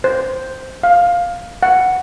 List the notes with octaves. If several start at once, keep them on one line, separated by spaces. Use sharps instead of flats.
C5
F5
F#5